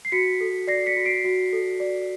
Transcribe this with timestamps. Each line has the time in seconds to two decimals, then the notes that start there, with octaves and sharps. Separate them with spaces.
0.05 C7
0.12 F#4 B6 C#7
0.41 A4
0.67 D5 A#6 C7
0.86 B6 C#7
0.97 F#4
1.05 C7 D7
1.24 F#4
1.53 A4
1.80 D5